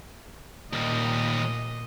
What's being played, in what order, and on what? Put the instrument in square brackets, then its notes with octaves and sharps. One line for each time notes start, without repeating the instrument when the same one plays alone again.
[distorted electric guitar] D#2 G3 [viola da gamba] A#2 D#5